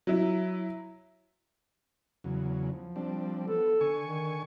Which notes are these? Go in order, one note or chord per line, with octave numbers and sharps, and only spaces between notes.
F#3 E4
E2 C#3 F#3
F3
G3 C4 D4
B3 A4
D3 G#5 C#6
D#3